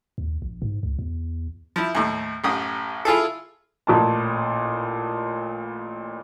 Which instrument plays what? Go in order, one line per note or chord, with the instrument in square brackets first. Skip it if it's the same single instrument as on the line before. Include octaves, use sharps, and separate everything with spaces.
[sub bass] D#2
A#1
G#2
C#2
E2
[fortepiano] F3 E4
D#2 A2
A1 F#2 G4 D#6
E4 F4 G#4 A4
[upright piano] A1 A#2 A5